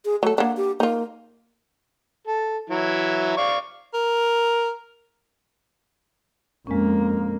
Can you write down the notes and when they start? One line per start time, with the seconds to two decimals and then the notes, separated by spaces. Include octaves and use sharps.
0.05 G#4
0.23 F#3 A3 A4
0.38 A#3 D4 F#5
0.57 G4
0.80 A#3 D#4 F4
2.27 A4
2.70 E3 F#3 E4
3.37 D5 F5 C#6
3.94 A#4
6.67 F2 G#3 A#3 C#4